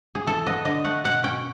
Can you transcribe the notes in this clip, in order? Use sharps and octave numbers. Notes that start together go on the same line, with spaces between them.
G#4
E3 A4
B3 D#5
D3 D#5
A3 F#5
B2 F#5
C#4 G5